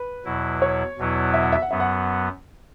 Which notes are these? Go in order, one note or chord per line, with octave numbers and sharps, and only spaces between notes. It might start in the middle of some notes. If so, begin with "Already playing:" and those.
Already playing: B4
E2 B2 F#3 E4
C#5
E2 B2 F#3 B3 E4
E5
F#5
E5
F#5
F#2 F#3 B3 E5
F#5